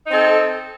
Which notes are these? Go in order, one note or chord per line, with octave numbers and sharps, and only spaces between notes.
C4 D#4 A4